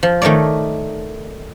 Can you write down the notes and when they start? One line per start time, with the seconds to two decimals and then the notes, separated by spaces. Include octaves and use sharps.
0.03 F3
0.22 D#3 A3 A#4 C#5 D5